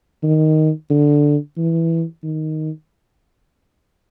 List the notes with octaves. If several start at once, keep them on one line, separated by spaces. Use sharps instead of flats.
D#3
D3
E3
D#3